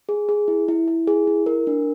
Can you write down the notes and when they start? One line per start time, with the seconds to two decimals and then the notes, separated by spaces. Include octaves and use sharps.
0.09 G#4
0.29 G#4
0.48 E4
0.68 E4
0.88 E4
1.07 G#4
1.27 E4
1.46 A#4
1.67 D4